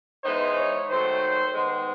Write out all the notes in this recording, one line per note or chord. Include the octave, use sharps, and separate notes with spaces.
E3 G#3 B3 D#4 C5
C#5
D#3 F#3 A3 C5
D#3 G#3 B3 C5